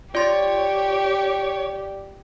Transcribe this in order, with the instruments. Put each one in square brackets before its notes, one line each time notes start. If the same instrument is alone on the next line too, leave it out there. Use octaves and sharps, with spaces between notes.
[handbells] F4 C6 A6 [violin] G4 [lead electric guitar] C#5 [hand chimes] D5